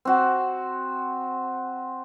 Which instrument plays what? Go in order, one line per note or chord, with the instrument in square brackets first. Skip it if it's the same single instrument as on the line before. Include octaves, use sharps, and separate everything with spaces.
[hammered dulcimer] C4 F#4